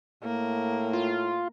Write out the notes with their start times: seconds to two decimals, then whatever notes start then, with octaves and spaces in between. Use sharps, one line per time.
0.23 A2 A#3
0.93 F4